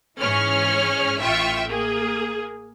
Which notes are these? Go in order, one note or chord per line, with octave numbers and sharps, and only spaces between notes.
G#2 E3 C#4 G#4 C#5 F6
A1 F4 E5 G5 C#6
A#3 G#4